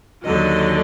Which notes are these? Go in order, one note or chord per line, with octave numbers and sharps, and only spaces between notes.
D#2 D3 F#3 D#5